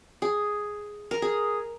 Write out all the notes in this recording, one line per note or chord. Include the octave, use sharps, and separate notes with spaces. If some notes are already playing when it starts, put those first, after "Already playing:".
G#4
A#4
G#4